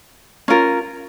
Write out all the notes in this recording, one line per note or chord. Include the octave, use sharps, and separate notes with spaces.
C#4 F4 A#4